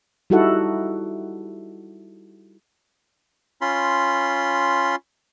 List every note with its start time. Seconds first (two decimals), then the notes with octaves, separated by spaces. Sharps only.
0.30 G3 D#4 E4 F#4 A4 F#5
3.61 C#4 F4 B5 C6